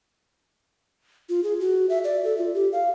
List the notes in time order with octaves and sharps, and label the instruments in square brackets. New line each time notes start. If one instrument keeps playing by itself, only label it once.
[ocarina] F4
G#4
F#4
E5
D5
A4
F4
G4
F5